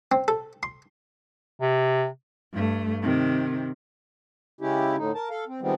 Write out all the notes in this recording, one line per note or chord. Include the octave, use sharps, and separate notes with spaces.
C4
A4
C6
C3
G2 A3
C3 D#3
C#3 G#3 C#4 E4 G4
A2 D3 D#4
A#4 A5
A4 F5
C4
D#3 F3 G3 G#3 B3 C4